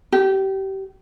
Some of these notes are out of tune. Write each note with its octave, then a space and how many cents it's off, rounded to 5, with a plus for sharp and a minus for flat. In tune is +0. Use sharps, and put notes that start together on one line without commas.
G4 -25